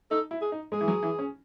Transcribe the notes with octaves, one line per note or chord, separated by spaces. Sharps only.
D#4 A4
E4
G#4
D#4
G#3 G#4
E3
F#3
E3
C#4